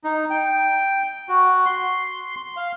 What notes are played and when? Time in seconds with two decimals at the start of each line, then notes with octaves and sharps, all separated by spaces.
0.04 D#4
0.30 G5
1.29 F#4
1.66 C6
2.57 F5